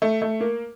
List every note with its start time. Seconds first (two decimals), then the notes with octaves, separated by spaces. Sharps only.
0.02 A3
0.22 A3
0.40 A#3